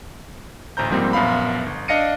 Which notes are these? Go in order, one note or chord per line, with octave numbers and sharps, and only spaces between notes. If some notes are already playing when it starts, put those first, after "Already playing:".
A1 D2 C5 A#5 G6
G#2 F3 G3 A#3 C4
A#1 F#2 B3 F5 B5
G1
D4 D#5 F5 A#6 C#7 D#7